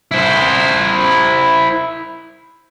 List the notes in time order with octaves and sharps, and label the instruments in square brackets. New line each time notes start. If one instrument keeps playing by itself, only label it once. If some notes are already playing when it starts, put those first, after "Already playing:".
[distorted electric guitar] E4 C5